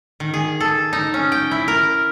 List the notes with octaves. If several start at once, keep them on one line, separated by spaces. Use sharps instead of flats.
D#3
G#4
A4
D#4
C#4
G5
E4
A#4